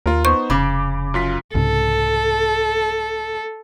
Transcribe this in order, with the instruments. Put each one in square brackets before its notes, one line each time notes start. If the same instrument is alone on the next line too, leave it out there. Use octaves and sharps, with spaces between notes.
[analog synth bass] D#2 [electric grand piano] F4 A#4
[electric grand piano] B3 D#4 C5 [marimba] C#6
[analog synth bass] F1 [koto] C#3 [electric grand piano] B5 D6
[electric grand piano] F#2 F4 B6
[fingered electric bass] C2 G#2 C#3 [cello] A4